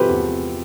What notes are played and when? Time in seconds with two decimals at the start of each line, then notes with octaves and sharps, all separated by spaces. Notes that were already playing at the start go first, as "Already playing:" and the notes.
Already playing: C3 F3 G4 A4 B4 C5
0.09 E2